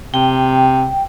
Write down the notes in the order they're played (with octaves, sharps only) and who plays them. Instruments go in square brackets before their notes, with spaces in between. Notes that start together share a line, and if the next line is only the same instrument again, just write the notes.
[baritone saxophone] C3 [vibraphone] G5